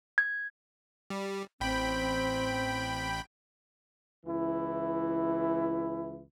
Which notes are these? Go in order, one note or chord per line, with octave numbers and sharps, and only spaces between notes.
G#6
G3
A1 C4 G5 B5
C#2 E3 E4